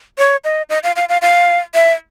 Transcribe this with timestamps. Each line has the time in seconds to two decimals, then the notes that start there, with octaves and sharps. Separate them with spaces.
0.18 C#5
0.44 D#5
0.70 D#5
0.83 F5
0.96 F5
1.09 F5
1.22 F5
1.74 E5